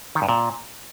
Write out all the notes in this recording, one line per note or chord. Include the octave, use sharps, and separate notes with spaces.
D#3
G2
A#2